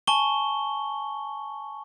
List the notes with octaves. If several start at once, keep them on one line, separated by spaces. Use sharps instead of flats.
G#5 A5 C#6 G7